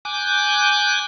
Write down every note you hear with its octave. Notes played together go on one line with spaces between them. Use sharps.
G#5 D6 F#6 G6